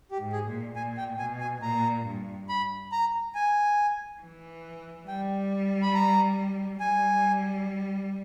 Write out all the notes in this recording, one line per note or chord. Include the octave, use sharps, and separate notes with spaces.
G4
G#2
G#4
A#2
A#2 G#5
G5
B2 G#5
G#5
A#2 A#5
G2
B5
A#5
G#5
E3
G3 G5
B5
A#5
G3 G#5